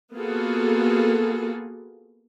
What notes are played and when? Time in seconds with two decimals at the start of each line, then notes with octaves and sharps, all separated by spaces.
0.14 A#3 B3 F4 F#4 G#4 A4